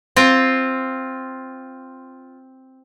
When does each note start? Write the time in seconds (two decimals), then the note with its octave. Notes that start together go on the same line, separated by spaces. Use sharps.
0.16 C4 F4